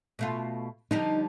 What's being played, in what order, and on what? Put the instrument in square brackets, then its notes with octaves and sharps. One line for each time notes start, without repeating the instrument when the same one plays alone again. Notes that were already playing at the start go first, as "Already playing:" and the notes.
[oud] B2 A3 F4
[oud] D3 F3 G3 [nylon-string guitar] D#4